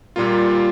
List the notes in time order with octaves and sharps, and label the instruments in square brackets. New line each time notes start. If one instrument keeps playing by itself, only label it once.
[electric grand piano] A#2 G3 A#3 F4